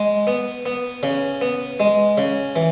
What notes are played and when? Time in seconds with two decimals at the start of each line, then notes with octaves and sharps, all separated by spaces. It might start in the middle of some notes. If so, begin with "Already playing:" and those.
Already playing: G#3
0.27 B3
0.66 B3
1.03 C#3
1.42 B3
1.80 G#3
2.18 C#3
2.56 E3